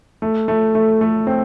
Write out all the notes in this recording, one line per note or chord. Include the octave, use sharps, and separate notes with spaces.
A3
A3
A3
A3
C4